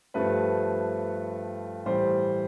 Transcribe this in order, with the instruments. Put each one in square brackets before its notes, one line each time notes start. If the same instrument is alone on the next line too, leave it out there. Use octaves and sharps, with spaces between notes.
[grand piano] G2 F3 A3 B4
A2 E3 G3 C5